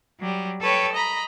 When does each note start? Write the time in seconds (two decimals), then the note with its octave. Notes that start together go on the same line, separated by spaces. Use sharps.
0.19 F#3 G3
0.60 A4 B4 C#5 G5
0.92 D#5 A#5 B5